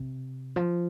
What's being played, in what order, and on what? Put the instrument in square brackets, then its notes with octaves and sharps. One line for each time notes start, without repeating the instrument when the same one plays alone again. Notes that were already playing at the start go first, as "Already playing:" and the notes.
Already playing: [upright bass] C3
F3